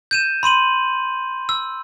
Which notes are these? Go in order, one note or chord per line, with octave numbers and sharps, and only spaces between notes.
G6 D#7 E7
B5 C6 D#7 F#7
E6